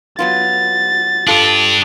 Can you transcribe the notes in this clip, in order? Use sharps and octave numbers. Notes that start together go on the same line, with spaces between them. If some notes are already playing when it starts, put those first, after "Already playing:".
F#3 B3 F4 A6
D4 F4 G4 A4